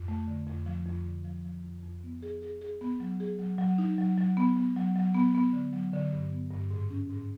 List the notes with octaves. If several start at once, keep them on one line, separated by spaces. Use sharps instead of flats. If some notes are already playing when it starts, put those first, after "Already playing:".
Already playing: F2
A3
D3
F2
F3
F2
D3
F3
F3
F2
F2
B3
G#4
G#4
G#4
B3
F#3
G#4
F#3
F#3
D#4
F#3
F#3
B3
B3
F#3
F#3
B3
B3
D3
F#3
D3
G2
B3
G2
G#2
C#4
G#2